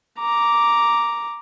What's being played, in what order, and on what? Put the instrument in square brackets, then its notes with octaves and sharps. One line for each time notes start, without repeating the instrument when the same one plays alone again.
[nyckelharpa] A#5 D6